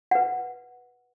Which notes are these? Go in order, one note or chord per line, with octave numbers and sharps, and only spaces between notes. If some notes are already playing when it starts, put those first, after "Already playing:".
B4 F#5